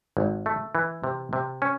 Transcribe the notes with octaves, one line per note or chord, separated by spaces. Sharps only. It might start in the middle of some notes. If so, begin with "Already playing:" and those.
G#1
A3
E3
C3
C3
C#4